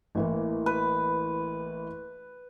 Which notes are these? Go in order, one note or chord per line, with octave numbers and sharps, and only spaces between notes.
A1 E3 A#3
B4